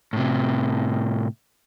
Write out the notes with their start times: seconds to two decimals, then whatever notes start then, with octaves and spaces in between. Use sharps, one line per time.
0.13 A2 C3